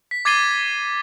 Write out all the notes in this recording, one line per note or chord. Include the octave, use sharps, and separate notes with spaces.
B6
D6 G#6 A6 C7 D#7 G7